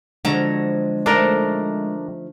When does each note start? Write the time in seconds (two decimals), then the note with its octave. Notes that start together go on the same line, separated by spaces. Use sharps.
0.25 D3 F3 F#3 G#3 F#4 A4 A#5
1.06 F3 A3 D4 D#4 A4 A#4